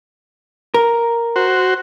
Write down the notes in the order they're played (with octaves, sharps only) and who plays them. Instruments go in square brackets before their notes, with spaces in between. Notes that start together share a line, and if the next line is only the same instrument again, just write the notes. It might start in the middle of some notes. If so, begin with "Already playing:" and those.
[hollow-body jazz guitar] A#4
[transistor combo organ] F#4 C5